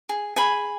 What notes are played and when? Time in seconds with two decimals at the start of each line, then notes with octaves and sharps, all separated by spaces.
0.09 G#4
0.36 G#4 G#5 B5